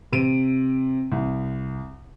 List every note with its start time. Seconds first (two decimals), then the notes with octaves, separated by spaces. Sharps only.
0.12 C3 D7 D#7
1.12 C2